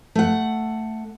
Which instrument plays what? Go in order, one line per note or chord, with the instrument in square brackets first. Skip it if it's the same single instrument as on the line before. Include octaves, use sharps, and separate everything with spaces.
[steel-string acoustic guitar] A3 F#5